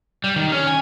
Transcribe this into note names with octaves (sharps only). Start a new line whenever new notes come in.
G3
D#3
C#4
G#5